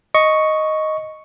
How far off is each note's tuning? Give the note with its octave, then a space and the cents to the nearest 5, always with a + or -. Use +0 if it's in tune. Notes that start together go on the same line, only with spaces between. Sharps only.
D#5 +0 C#6 +0